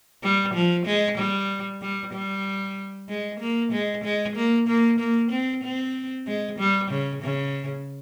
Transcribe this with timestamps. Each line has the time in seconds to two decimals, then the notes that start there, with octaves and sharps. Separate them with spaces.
0.23 G3
0.54 F3
0.86 G#3
1.18 G3
1.81 G3
2.13 G3
3.09 G#3
3.40 A#3
3.72 G#3
4.04 G#3
4.36 A#3
4.68 A#3
4.99 A#3
5.31 C4
5.63 C4
6.27 G#3
6.59 G3
6.91 C#3
7.22 C#3